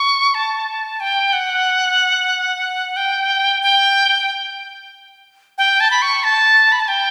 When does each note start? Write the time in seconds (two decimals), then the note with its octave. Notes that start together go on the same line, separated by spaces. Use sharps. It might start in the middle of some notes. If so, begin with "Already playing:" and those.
Already playing: C#6
0.34 A5
1.00 G5
1.33 F#5
2.97 G5
3.62 G5
5.58 G5
5.80 A5
5.91 B5
6.02 C#6
6.24 A5
6.72 B5
6.80 A5
6.88 G5